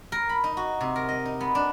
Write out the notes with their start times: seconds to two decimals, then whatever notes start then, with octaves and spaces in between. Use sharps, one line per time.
0.12 A#4
0.29 B5
0.44 D#4
0.57 F#4
0.81 C3
0.96 A#4
1.09 D#5
1.25 D#4
1.41 B3
1.55 D4